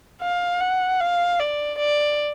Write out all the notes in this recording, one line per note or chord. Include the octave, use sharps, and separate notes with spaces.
F5
F#5
F5
D5
D5